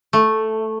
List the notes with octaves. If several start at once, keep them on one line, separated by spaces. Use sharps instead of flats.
A3